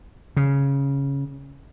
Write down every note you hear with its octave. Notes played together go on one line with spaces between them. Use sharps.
C#3